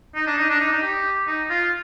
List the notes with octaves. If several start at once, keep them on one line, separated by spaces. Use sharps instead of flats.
D#4
D4
D#4
D4
D#4
D#4
G4
D#4
F4